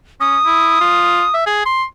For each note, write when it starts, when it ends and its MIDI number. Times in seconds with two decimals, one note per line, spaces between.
0.21 0.38 61
0.21 1.34 87
0.46 0.77 64
0.81 1.25 65
1.34 1.46 76
1.46 1.64 68
1.66 1.84 84